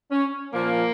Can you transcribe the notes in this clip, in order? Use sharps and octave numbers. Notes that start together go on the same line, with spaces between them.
C#4
A#2 F3 A#3